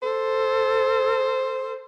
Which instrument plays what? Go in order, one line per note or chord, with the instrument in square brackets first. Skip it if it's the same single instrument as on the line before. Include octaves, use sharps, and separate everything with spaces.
[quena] A4 [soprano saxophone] C5